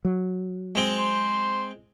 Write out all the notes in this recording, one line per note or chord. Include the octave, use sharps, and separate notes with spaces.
F#3
G#3 C4
C5